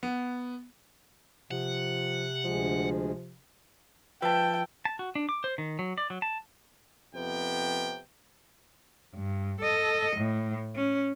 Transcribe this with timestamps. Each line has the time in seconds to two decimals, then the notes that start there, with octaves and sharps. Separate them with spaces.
0.03 B3
1.51 C3 F3 F#5
2.44 D2 F3 G#3
4.22 F3 B4 E5 G5 A5
4.85 A5
4.99 F#4
5.15 D4
5.29 D6
5.44 C5
5.58 D#3
5.79 F#3
5.98 D5
6.10 F#3
6.22 A5
7.14 F2 C3 B3 G5
9.14 G2
9.60 A4 D#5
10.16 A2
10.75 C#4